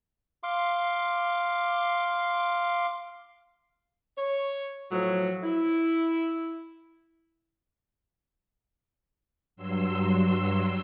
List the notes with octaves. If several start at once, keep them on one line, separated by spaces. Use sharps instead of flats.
F5 C6 D6
C#5
A2 F3 F#3
E4
G2 F#3 C6 E6